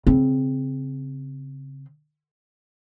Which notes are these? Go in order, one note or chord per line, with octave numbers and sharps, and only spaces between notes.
C#3 C4